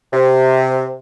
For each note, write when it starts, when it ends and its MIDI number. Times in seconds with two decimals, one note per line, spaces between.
0.13 0.95 48